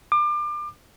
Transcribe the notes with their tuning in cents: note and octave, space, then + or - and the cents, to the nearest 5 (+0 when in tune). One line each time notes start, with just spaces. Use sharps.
D6 +30